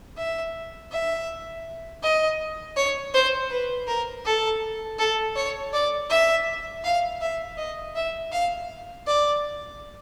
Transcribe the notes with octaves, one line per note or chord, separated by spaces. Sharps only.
E5
E5
D#5
C#5
C5
B4
A#4
A4
A4
C#5
D5
E5
F5
E5
D#5
E5
F5
D5